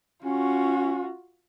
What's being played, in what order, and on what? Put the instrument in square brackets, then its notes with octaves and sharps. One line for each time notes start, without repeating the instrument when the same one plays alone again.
[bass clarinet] C#4 [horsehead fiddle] F4 F#4